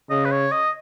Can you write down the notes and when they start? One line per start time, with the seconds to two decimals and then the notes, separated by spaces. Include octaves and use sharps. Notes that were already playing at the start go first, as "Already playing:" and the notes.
0.10 C#3 D#5
0.25 B4
0.31 C#5
0.52 D#5